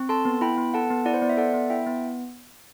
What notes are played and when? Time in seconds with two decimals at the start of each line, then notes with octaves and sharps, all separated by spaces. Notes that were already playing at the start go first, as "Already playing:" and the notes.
Already playing: C4
0.09 A4 A5 C6
0.25 B3
0.41 E4 G5 B5
0.58 B3
0.74 A4 F#5 A5
0.90 B3
1.05 E4 D5 F#5
1.14 C5
1.22 B3 D5
1.29 E5
1.37 A4 D5 F#5
1.54 B3
1.70 E4 E5 G5
1.86 B3